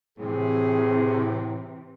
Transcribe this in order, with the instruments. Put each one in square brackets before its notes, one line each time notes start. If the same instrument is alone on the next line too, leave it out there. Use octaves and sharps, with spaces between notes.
[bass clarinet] A2 [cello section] C3 E3 [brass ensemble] G#4